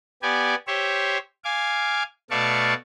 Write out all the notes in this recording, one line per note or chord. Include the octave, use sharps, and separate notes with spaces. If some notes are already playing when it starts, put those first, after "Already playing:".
B3 G4 D5 G#5
G4 C5 C#5 E5
F5 G#5 D6
B2 A3 D5 F5 A5 C#6